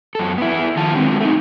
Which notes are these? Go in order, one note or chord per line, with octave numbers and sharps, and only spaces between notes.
F#2 A4
B3 E4
D#3 F3 A5
D3 F#3 G#3 C4
A3 D#4